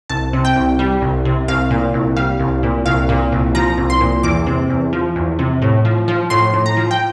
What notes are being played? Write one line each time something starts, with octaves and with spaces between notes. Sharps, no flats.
C2 A5
C3
G5
C2
G3
C2
C3
C2 F5
A#2
C2
G3 F5
C2
A#2
C2 F5
A#2
C2
F3 A#5
C2
C6
A#2
E2 D6
C3
E2
F3
E2
C3
A2
F3
F3
A2 C6
A2
A#5
F3
G5